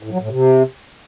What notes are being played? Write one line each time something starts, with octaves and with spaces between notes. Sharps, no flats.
A2
F#3
A2
C3